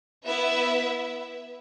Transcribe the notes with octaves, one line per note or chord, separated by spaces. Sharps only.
B3 E4 B4 E5